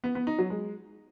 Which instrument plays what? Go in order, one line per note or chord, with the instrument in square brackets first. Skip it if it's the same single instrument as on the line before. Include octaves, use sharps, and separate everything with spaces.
[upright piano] B3
B3
D#4
F#3
G#3